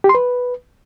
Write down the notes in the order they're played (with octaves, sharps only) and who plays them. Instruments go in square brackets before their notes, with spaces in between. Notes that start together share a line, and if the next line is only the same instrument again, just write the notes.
[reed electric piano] G4
C6
B4